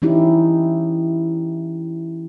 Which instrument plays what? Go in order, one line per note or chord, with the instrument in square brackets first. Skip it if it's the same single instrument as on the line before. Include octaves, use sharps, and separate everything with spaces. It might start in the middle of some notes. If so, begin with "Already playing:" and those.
[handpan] E3 C#4 D#4 E4 G4